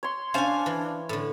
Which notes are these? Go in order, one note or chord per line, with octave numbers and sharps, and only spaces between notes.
C#5 C6
C#4 D4 C5 F5 G#5 A5
E3
A2 D3